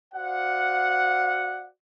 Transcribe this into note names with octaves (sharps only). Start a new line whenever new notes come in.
F#4 C5 D5 F5 F#5